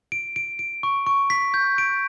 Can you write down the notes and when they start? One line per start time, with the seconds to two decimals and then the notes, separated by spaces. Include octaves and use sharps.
0.12 D7
0.36 D7
0.59 D7
0.83 C#6
1.06 C#6
1.30 B6
1.54 G6
1.78 D7